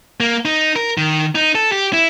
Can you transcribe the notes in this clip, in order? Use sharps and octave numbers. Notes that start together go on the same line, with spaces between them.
A#3
D#4
A#4
D#3
D#4
A4
G4
E4